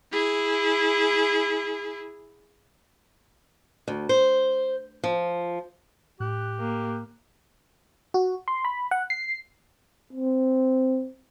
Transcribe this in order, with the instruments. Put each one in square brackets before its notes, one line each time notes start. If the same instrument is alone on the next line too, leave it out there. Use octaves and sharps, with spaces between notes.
[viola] E4 G#4
[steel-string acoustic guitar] D2
C5
F3
[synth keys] A2 F#6 [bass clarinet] G4
[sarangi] A#3
[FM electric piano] F#4
C6
B5
F#5
C7
[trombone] C4